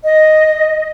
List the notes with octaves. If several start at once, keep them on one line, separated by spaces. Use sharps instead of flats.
D#5